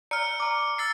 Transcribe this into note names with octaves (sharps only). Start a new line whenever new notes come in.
D5 A#5 E6 F6 C#7
A#5 D6
E6 A6 C7